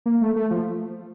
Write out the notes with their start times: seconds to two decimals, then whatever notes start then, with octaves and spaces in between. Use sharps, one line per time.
0.06 A#3
0.21 A3
0.36 A3
0.50 F3